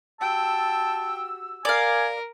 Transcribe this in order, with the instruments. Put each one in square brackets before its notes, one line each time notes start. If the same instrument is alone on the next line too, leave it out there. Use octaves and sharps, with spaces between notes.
[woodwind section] F#4 G4 E6 [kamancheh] G5 [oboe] A5
[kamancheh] A#4 [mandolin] D5 F5 [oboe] G#5